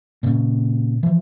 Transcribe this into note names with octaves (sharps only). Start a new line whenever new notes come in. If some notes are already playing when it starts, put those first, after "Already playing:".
A#2 C#3
E3 F3